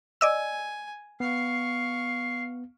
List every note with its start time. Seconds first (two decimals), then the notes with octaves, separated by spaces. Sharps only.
0.21 D5 D#5 G#5 E6
1.20 B3 F5 C#6 C7